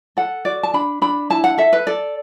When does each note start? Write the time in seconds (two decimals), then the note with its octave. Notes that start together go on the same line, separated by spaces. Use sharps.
0.17 A4 F#5
0.45 F#4 D5
0.63 A5
0.74 D4 B5
1.02 D4 B5
1.30 E4 A5
1.44 F#5
1.58 A4 E5
1.73 B4
1.87 A4 D5